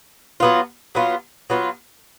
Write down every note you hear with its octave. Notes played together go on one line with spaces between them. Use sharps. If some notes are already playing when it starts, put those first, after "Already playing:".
F#3 B3 F4
F#3 B3 F4
F#3 B3 F4